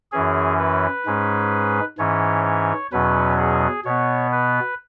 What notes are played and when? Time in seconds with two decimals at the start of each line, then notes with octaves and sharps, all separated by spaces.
0.12 F#2 E3 C#4 G#4
0.59 B4
1.06 G#2 G#3 C#4
1.98 G#2 E3 C#4 C#5
2.45 C#5
2.92 E2 B2 F#3 C#4 B4
3.38 G#4
3.85 B2 B3 C#5
4.32 B4